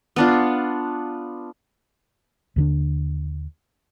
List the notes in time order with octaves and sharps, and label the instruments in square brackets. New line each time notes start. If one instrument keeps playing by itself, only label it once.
[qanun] B3 D4 F4
[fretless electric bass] D#2 D3 D4